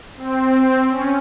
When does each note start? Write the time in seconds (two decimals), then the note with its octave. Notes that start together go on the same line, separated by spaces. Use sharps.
0.17 C4
0.89 C#4